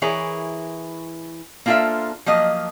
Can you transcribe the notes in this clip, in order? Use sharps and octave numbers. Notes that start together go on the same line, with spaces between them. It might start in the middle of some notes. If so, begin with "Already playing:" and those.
E3 E4 G#4 A#4 C#5
A#3 D4 F4 A4 C5 E5
F3 F#3 A#3 D#5